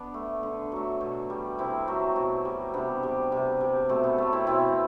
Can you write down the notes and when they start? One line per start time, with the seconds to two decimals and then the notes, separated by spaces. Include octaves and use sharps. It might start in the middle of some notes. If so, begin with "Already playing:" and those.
Already playing: B3 D4
0.14 A3
0.43 D3
0.72 F#3 A3
1.01 B2
1.30 G3
1.58 C3 C4 E4
1.87 F#3 A3
2.16 B2
2.45 G3
2.74 C3 B3 D4
3.03 G3
3.32 C3
3.61 G3
3.89 B2 A3 C4
4.04 B3
4.18 F#3 A3 B3
4.33 C4 E4
4.47 B2 C4 E4